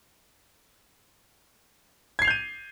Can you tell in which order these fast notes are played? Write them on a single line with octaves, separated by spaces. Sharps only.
G#6 C7 F7 G6 D#7